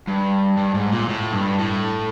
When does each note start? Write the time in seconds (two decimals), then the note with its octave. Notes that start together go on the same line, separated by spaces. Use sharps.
0.07 G2
0.57 G2
0.75 G#2
0.92 A#2
1.09 A2
1.33 G2
1.59 A2